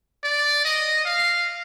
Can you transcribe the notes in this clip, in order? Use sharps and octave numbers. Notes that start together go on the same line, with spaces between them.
D5
D#5
F5